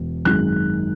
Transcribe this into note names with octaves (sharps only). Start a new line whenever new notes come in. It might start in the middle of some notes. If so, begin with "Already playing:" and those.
Already playing: E1
G#1 F#2 D#3 G#3 F#6